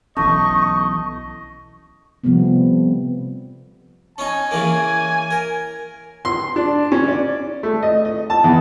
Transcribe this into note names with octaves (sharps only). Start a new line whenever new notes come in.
B1 E3 A3 C#4 D#5 C#6
C3 F3 G3 A3 B3
C#4 D#4 G#5
C#3 E3 A#3
A#4
C6
D4
C#4
D5
A3
D#5
D#5
A5
E2